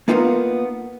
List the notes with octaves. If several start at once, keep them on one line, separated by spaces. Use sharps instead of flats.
A#3 B3 D#4 F4 A4 A#4